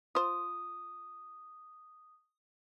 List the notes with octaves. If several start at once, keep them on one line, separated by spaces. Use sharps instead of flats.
F4 C5 D#6